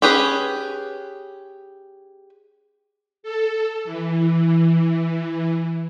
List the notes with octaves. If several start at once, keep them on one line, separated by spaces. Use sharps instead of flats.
C#4 G4 G#4 B4
A4
E3